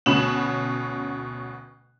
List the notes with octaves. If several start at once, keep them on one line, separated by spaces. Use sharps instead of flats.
D2 B2 C#4 B5 E7 F#7